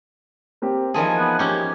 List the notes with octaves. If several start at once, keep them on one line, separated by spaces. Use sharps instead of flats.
A#3 C4 G4
E3 F3 D#4 G#4 A#4 A5
B3
A#3 C#4 G4